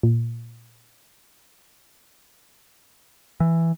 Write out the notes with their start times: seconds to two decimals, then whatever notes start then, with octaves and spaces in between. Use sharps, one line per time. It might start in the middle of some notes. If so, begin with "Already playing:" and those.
0.03 A#2
3.40 E3